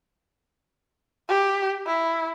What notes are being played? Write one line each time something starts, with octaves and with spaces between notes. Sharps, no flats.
G4
E4